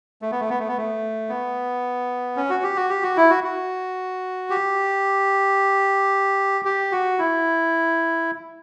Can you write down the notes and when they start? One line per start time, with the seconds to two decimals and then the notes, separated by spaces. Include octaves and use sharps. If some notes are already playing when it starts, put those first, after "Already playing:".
0.22 A3
0.31 B3
0.40 A3
0.50 B3
0.59 A3
0.68 B3
0.77 A3
1.29 B3
2.36 C#4
2.50 F#4
2.63 G4
2.76 F#4
2.90 G4
3.03 F#4
3.17 E4
3.30 F#4
3.44 F#4
4.50 G4
6.65 G4
6.92 F#4
7.19 E4